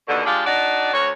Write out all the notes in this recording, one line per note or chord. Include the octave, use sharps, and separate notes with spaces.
D#2 B2 D3
G#3 D4 F4 G4
D4 D#4 F#4 D5
D2 F#4 C#5